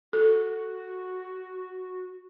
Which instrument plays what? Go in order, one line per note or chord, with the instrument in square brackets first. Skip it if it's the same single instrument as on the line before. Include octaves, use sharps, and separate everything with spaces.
[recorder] F#4 [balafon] A4